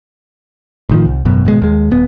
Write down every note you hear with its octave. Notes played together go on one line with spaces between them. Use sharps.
A1 D#3 F3
C2
G#1 F#2 B2
G#1 B2 G#3
D#2 G#3
D#1 B3